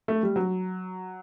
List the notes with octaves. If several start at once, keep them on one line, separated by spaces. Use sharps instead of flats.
A3
G3
F#3